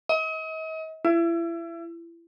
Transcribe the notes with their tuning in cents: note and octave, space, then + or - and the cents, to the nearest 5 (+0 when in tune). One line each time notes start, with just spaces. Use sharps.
D#5 +40
E4 +30